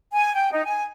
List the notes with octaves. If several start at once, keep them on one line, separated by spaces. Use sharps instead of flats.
G#5
G5
D#4
G#5